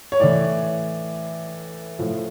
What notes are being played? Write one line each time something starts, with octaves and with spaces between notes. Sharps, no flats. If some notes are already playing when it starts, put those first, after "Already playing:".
C#5
A2 E3 D5
A2 F3